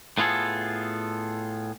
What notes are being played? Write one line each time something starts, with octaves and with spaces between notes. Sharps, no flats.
A2 B3 F4 G#4 A4